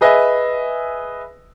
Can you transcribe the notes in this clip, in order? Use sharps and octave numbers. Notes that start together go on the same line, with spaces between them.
G#4 B4 D#5 E5 G#5